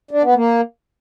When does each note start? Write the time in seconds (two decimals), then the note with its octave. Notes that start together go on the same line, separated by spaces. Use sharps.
0.11 D4
0.23 B3
0.35 A#3